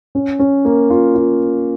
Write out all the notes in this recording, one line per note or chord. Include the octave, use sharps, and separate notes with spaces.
C#4
C#4
A#3
F4
F4